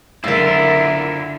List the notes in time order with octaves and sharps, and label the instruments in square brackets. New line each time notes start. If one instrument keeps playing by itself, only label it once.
[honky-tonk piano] F#1 E6 [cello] D3 [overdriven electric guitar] E4 A#4 [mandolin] F4 E5